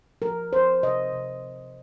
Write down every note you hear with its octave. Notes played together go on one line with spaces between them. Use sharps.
F3 A#4
F3 C5
C3 D#5
C3